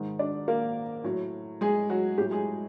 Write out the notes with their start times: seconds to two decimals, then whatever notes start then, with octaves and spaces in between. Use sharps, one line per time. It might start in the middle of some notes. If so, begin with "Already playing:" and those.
Already playing: G#2 D#3 G#3
0.19 D4 D5
0.48 A#3 A#4
1.04 A2 F#3
1.61 G#3 G#4
1.89 F#3 F#4
2.18 A2 F#3 G3 G4
2.31 G#3 G#4